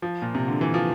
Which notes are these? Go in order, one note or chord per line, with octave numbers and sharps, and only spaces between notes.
F3
A#2
C3
D3
E3
F3